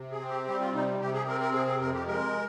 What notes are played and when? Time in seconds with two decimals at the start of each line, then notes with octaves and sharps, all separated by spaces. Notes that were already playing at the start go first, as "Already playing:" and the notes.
Already playing: C3
0.11 G#4
0.20 C4
0.29 G4
0.47 G3 G4
0.60 F4
0.73 C3 D#4
1.00 C3 G4
1.14 G#4
1.27 C4 A#4
1.41 A#4
1.53 C3 G#4
1.67 G#4
1.80 F2 A#4
1.94 G4
2.07 G#3 A#4